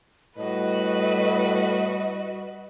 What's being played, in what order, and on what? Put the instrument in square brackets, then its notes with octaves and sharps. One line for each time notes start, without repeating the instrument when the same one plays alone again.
[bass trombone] A2 [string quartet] G3 F#4 [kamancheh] B4 [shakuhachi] D#5